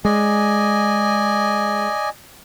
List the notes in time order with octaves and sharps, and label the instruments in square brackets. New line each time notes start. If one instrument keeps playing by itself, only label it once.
[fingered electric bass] G#3 [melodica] D5 D#5 G#5